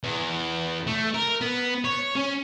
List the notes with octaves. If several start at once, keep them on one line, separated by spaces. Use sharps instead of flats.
E2
A3
A#4
B3
C#5
C#4